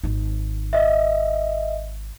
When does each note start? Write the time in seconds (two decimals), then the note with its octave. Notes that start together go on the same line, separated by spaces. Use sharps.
0.04 G#1 D#4
0.73 D#5 E5